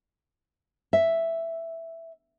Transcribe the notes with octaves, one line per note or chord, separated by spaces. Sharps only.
E5